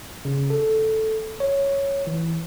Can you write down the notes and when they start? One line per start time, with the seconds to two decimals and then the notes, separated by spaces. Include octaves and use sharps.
0.25 C#3
0.50 A4
1.40 C#5
2.07 E3